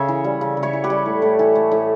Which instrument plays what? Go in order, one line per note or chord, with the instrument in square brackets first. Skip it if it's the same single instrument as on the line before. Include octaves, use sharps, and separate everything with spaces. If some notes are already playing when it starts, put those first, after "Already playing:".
Already playing: [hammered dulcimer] C#3 C#5 E5
E3
G3
C#3
C#3
C#5 E5
E3
G4 B4
G3
A2
A2
E3
A3
A2